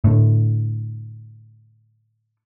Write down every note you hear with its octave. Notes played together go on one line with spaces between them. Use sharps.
A2 D3